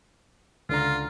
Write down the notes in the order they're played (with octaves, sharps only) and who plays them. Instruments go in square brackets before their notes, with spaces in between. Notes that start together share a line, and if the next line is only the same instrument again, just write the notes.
[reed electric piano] C#2 D3 A#5 [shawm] F4